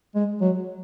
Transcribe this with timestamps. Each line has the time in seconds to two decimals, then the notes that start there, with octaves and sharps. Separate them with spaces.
0.15 G#3
0.41 F#3